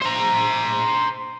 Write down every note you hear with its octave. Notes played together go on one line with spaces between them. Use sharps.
C5 A#5